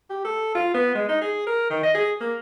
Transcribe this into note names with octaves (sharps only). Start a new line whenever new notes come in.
G4
A4
F4
B3
G#3
D#4
G#4
A#4
D#3
D#5
G#4
A#3